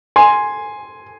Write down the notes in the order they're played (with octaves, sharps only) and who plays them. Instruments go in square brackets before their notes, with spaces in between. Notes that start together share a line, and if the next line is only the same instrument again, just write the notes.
[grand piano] G#5 C6